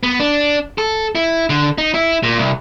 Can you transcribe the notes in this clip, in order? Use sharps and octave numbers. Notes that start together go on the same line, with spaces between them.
B3
D4
A4
E4
D3
D#4
E4
A#2
C2